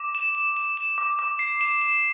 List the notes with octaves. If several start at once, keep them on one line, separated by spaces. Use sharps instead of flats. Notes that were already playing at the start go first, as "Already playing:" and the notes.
Already playing: D6
E7
E7
E7
E7
D6
D6
C7
E7
E7